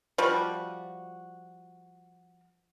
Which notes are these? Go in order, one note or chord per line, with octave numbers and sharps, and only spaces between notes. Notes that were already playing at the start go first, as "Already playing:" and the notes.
F3 G3 F#4